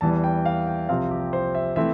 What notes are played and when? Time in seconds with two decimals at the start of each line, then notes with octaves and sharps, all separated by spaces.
0.01 E2 E3 G3 A5
0.24 G5
0.45 F5
0.67 G5
0.89 C2 C3 F3 C4 F5
1.11 G4
1.33 C5
1.55 E5
1.76 E3 A3 C4 E5